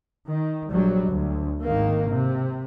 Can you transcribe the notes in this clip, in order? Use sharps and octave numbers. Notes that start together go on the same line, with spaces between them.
D#3
A#1 F#3 G3
D2
G#1 D#3 A#3
C3